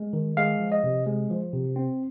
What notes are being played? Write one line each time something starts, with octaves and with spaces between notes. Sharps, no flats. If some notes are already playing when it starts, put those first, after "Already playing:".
Already playing: G#3
D#3
G#3 F5
F3
D#5
C3
G#3
F3
C3
C4